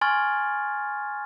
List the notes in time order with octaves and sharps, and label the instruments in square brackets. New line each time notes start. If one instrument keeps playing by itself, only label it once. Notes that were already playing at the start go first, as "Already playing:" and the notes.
[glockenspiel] G#5 C6 C#6 F6 G#6 A6